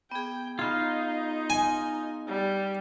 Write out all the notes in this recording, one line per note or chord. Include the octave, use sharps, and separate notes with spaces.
B3 G#4 G5
B3 D#4 F4 G#4 F5
G#5
G3